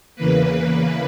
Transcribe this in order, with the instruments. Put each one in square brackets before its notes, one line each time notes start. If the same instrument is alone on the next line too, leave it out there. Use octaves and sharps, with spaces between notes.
[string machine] E2 C#3 E3 A#3 B4